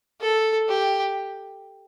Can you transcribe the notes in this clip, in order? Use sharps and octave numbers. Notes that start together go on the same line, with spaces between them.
A4
G4